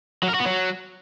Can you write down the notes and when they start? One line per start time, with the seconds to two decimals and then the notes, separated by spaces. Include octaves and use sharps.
0.23 F#3
0.29 A#4
0.34 F#4
0.40 B3
0.46 F#3